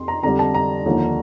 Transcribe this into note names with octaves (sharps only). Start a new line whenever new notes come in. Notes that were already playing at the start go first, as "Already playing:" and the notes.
Already playing: F2 C6
A#5
F2 D3 G3 A#5
A5
A#5
D#2 D3 F3